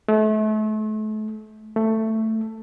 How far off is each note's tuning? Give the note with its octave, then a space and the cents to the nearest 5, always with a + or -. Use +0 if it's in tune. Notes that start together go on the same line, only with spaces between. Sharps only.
A3 -35
A3 +10